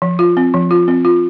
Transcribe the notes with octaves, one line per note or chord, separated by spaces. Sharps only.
F3
F4
C4
F3
F4
C4
F4